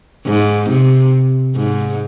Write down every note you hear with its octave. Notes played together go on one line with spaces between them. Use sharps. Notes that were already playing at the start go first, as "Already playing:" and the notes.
G#2
C3
G#2